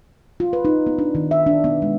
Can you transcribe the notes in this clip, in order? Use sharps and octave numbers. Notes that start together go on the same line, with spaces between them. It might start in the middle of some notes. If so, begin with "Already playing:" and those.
F4
B4
D#4
B3
D4
D#3
E5
D4
B3
G#3